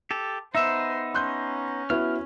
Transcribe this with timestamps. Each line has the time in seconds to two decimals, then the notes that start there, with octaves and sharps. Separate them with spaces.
0.11 G4 A4
0.55 B3 D#4 C5 E5 E6 E7
1.14 C#4 C6 F#6 G6
1.90 B3 E4 F#4 F6